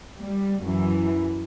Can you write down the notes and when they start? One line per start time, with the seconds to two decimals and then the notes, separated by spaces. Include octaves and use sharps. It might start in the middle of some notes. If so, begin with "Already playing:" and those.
0.20 G3
0.62 F#2 E3